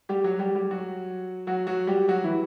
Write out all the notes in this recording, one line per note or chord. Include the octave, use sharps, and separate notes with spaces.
G3 G4
F#3 F#4
G3 G4
G3 G4
F#3 F#4
F#3 F#4
F#3 F#4
G3 G4
F#3 F#4
E3 E4